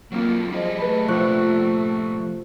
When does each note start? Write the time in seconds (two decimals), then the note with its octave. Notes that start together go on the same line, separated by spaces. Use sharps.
0.12 F#3 A#3 C4 F4
0.52 F3 G4 G#4 D#5
0.78 A3 B4 A5 B5
1.08 C3 F3 F4 D5 C#6 F#6